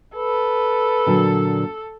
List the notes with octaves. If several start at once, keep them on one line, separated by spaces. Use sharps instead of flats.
A4 B4
A#2 D3 F#3